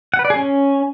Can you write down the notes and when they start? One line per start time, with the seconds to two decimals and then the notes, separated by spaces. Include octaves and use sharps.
0.14 F#5
0.19 B4
0.25 D5
0.30 G#4
0.36 C#4